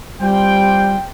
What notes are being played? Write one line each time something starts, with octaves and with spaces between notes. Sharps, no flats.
G3 C4 F4 G5